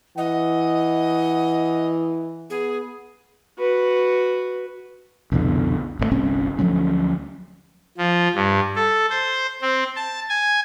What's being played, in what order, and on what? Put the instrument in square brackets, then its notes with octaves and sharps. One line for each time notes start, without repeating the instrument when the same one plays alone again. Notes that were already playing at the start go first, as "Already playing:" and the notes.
[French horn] E3 [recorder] D#5 [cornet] F#5
[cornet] B3 [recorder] G#4
[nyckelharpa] F#4 B4
[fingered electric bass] C2 F2 B2 D3
G#1 C#3 A3
G1 C2 C4 C#4
D2 F3 F#3 C#4
[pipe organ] F3
G2
A4
C5
C4
A5
G#5